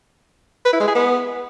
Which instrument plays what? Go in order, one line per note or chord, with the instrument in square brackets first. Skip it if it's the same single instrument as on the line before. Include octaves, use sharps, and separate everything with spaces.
[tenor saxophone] B4
E4
G#3
G#4
B3